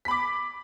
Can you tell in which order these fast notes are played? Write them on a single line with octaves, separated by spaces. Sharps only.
B6 B5 D6